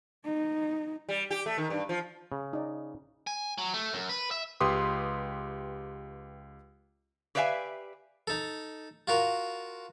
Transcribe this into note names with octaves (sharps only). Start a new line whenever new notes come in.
D#4
G3
G4
A3
D#3
G2
F3
C#3
D#4 D5
G#5
F#3
A3
F#2
B4
E5
C#2 G4 B4 C6 D#6
G4 B4 D5 E5 F5 G#5
D#4 A4
F4 F#4 A#4